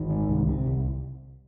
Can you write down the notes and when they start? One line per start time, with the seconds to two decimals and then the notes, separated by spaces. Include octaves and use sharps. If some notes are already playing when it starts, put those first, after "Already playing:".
Already playing: G#1 D#3
0.10 G#2
0.29 C2
0.48 C3
0.66 C2